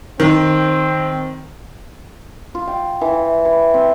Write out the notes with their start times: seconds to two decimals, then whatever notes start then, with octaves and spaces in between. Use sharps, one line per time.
0.20 D#3 C4
2.55 F4
2.67 G5
3.01 E3
3.45 B4
3.74 C4